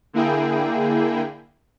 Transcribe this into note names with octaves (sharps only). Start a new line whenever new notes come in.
D3 A#3 E4 G#4 G5